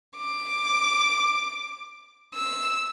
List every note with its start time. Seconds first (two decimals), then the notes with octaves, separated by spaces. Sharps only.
0.16 D6
2.35 E6